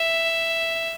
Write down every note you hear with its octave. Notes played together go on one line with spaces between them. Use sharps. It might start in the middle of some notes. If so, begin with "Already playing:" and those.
Already playing: E5